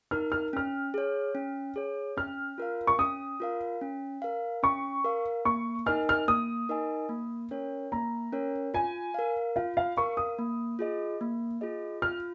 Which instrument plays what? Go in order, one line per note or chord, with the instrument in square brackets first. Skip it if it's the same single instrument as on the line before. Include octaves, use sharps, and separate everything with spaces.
[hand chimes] D#4 A#4 [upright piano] F6
[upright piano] F6
[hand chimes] C#4 [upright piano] F6
[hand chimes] G#4 C#5
C#4
G#4 C#5
[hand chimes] C#4 [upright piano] F6
[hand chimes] F4 A#4 F5
[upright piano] C#6
[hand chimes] C#4 [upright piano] D#6
[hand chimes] F4 A#4 F5
C#4
A#4 F5
[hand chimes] C#4 [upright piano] C#6
[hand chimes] A#4 F5
[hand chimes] A#3 [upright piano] C#6
[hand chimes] D#4 A#4 D#5 G#5 [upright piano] F6
[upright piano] F6
[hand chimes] A#3 [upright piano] D#6
[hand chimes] D#4 A#4 D#5 G#5
A#3
C#4 A#4 C#5
[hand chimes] A#3 [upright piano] A#5
[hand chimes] C#4 A#4 C#5
[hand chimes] F4 [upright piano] G#5
[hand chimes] A#4 F5
[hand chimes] F4 [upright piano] F5
[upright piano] F5
[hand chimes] A#4 F5 [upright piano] C#6
[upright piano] D#6
[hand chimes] A#3
F4 G#4 D#5
A#3
F4 G#4 D#5
[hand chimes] F4 [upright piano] F6